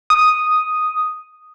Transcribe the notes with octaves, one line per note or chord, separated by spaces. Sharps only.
D#6